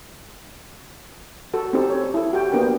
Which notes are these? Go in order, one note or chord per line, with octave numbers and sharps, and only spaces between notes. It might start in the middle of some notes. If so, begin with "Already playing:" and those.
F#4 A4
C4 C#4 D#4 G4 A4
C#5
E4 A4
F#4 G4 G5
A#3 B3 D4 A#4 G5